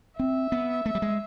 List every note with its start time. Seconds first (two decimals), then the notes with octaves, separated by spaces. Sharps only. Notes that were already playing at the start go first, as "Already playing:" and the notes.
0.19 C4 E5
0.52 B3
0.86 A3
0.95 G3
1.02 G#3